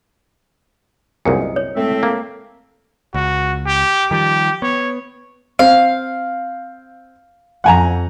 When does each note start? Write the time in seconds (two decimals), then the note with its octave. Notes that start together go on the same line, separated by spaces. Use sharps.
1.25 C2 F#2 A#2 G#4 B4 C#7
1.40 D#5
1.56 C#5
1.75 A2 G#3 A3 C4 E5
2.03 A#3
3.14 C#2 F#4
3.66 G4
4.11 D#3 F3 G3 G4
4.62 B3 C#5
5.59 C4 F5
7.64 F2 F#5 G#5 A#5